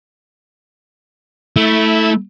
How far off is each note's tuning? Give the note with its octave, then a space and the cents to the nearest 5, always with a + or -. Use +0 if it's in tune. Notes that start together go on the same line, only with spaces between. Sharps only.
A3 +0 E4 -15